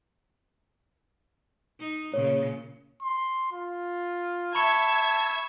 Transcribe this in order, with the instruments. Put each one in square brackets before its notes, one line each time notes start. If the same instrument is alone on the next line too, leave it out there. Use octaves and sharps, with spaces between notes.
[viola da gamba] D#4
[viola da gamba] A#2 C#3 [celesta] C#5
[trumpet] C6
F4
[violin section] E5 E6 G#6 [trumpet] A5 [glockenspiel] B5 C#6 C#7